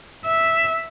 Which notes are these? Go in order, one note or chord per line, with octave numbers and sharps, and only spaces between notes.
E5